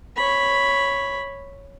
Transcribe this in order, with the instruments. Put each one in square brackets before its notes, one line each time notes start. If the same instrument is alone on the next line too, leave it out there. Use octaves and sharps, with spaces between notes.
[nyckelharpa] C#5 B5